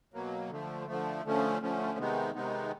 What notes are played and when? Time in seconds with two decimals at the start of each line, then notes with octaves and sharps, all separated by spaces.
0.14 B2 F#3 A#3
0.50 D3 F3 A3
0.87 D3 F3 A3
1.25 D3 F3 A3 C#4
1.61 D3 F3 A3 C#4
1.98 C3 D#3 G#3 B3 D#4
2.35 C3 D#3 G#3 B3 D#4